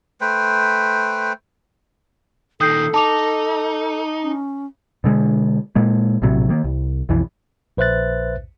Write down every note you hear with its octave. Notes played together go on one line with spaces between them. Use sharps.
A3 B4 C5 G5
A#2 D#3 A4 D#6 G6 C7
D#4 A5 D6 F7
C#4
B2 D3 G#3
A#2 G#3 A#3
A#1 A2 C3 F#3
D#3 A#3
C2
B1 F2 E3
A#1 B4 C5 E5 F#6 A6